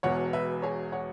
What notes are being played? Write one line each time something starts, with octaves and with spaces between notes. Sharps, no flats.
E1 E2 B2 C#5 F#5
B4 E5
G#4 C#5
C#5 F#5